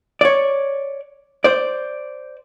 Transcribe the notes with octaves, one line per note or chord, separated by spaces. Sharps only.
C#5 D5
C5 D5